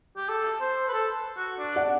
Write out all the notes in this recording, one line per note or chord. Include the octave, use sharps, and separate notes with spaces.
G4
A4
C5
B4
A4
F#4
D4
D5 F#5